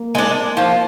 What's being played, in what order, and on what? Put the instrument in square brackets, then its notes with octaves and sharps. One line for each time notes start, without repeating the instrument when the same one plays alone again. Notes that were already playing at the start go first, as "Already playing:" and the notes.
Already playing: [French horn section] A#3
[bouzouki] G#3 D4
F3